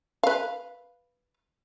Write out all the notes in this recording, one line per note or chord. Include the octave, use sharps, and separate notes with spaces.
B4 F5